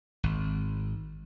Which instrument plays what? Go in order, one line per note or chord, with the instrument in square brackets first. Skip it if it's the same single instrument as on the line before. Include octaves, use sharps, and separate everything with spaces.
[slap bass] G#1